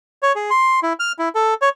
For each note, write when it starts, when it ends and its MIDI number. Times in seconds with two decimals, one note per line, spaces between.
0.23 0.33 73
0.35 0.50 68
0.50 0.80 84
0.83 0.93 64
0.99 1.12 89
1.19 1.29 64
1.35 1.54 69
1.62 1.69 73